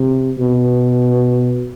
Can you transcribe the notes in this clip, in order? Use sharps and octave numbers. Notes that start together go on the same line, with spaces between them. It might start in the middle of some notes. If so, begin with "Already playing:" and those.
Already playing: C3
B2